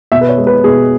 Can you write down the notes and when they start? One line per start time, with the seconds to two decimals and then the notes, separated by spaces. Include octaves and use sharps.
0.12 B2 E5
0.21 B4
0.29 C#5
0.38 G#3
0.47 B4
0.64 B2 G#4